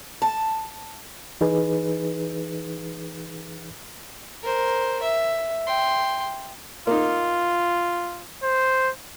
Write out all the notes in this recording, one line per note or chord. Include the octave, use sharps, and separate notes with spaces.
A5
E3 D#4 G#4 B4
A#4 C5
E5
G5 C6
A#3 D#4 F4
C5